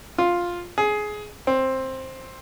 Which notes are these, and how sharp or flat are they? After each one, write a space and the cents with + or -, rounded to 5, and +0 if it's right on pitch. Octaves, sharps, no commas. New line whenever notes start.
F4 +5
G#4 +15
C4 +10